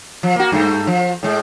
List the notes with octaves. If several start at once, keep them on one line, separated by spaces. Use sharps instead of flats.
F3
A#3 F#4
G2 A3
F3
A2 G#3